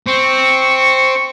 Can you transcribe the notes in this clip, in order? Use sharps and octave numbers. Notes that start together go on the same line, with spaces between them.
C4 C#6